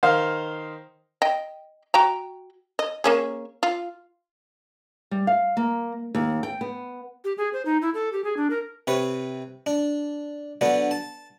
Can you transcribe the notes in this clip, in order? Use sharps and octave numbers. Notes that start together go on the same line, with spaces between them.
D#3 C5 F5
D#5 G5
F#4 G5 A#5
D#5
A#3 C#4 G#4
F4
G3
F5
A#3
D#2
G5
B3
G4
G#4
C5
D#4
E4
A4
G4
G#4
D4
A#4
C3 B4 C#5
D4
D3 F#3 B3 D4
A5